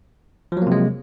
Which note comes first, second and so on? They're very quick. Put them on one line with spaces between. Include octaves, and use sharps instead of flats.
F3 F#3 A#3 C3 G#3